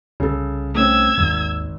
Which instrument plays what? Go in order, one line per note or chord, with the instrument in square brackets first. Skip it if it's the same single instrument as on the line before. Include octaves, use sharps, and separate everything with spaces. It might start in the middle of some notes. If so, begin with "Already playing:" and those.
[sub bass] C2 [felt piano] C#3 A4
[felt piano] A3 C4 C#4 [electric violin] E6 G#6
[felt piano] G#1 [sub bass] D#2